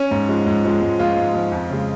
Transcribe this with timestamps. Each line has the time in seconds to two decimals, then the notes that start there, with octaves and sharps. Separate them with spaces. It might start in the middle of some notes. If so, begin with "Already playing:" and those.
Already playing: C#4
0.11 G#2
0.28 F3 G#3
0.46 G#2
0.64 F3 G#3
0.82 G#2
0.99 F3 G#3 F4
1.17 G#2
1.34 F3 G#3
1.52 F2
1.70 C#3 G#3